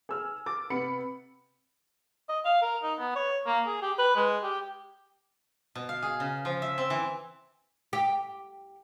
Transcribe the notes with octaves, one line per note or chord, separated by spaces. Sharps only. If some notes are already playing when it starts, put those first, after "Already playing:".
G#4 E6 F6
D6 A6
C3 B3 B5 C#7
D#5
F5
A#4
D#4
B3
C#5
A#3
G#4
G4
B4
G#3
G4
B2
F5
G#4
C#3
F3
E5
C4
E3
G4